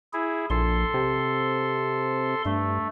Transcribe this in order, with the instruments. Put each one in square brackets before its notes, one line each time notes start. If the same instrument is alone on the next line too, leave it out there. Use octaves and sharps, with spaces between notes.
[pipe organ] E4 G#4
[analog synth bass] A#1 [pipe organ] A4 C6
[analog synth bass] C3
[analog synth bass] G2 [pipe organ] A3